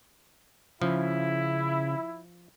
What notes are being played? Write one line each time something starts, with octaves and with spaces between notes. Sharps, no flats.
C#3 F3 E4